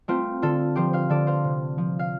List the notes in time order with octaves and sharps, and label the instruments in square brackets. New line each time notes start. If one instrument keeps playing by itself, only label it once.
[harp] A3 C4 F4
D3 F4 A4
F3 G4 C5
C5 F5
D3 A4 D5
C5 F5
C3
F3
F5